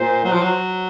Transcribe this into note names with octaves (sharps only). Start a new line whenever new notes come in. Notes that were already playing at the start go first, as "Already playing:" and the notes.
Already playing: A#2 C5
F#3
F3
F#3